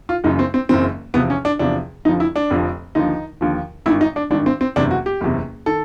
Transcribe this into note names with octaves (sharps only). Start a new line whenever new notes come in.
F4
F#1 F#2 C#3 E3 D#4
C4
C4
F#1 F#2 C#3 E3 C4
E2 C3 F3 B3
C#4
D4
E2 C3 F3 D4
F1 F2 D3 F3 D#4
E4
D4
F1 F2 D3 F3
D#2 D3 F3 D#4
D#2 D3 F3
G#1 G2 D#3 E4
D#4
D4
G#1 G2 D#3 D4
C4
C4
F#1 E2 C3 D4
F#4
G4
F#1 E2 C3
D#3 A4